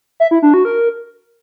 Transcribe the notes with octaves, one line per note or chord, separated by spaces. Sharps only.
E5
E4
D4
F#4
A#4